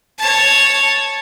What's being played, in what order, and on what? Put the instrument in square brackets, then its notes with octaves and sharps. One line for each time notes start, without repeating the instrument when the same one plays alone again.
[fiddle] C#5 A5